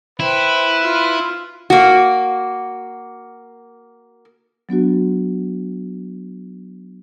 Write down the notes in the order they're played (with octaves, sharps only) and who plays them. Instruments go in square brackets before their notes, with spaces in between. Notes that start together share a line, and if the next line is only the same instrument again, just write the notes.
[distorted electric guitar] E4 [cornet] B4 [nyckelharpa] C5 G5
[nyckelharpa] F4
[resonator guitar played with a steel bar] A#3 F#4
[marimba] F#3 B3 D4 F#4